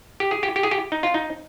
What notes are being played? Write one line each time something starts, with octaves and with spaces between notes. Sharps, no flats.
G4
G#4
G4
G4
G#4
G4
D#4
F4
D#4